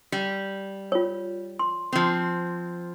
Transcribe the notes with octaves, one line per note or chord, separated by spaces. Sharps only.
G3
F4 C#5
C6
F3 C4